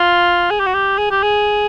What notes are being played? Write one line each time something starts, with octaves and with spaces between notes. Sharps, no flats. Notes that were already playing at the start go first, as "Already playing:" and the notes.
Already playing: F4
G#4
G4
F#4
G4
G#4
G4
G#4